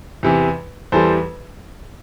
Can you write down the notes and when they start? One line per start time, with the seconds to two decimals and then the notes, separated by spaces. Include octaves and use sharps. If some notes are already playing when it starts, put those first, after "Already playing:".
0.23 E2 C3 E3
0.92 E2 E3 G3 A4 C5